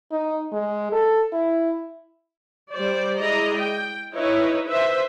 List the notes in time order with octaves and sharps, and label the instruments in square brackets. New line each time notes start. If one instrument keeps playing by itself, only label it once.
[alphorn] D#4
G#3
A4
E4
[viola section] G3 C5 D5
G#3 E4 G#4 D5 D#5 A#5
G5
D#4 E4 B4 C#5
B4 C5 E5